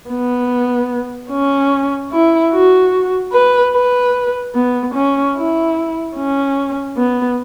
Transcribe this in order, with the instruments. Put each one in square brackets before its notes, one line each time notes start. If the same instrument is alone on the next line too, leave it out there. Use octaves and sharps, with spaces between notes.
[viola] B3
C#4
E4
F#4
B4
B4
B3
C#4
E4
C#4
B3